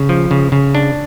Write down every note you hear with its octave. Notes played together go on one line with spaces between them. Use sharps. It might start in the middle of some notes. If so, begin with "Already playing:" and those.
Already playing: C#3
F3
C#3
C#3
D4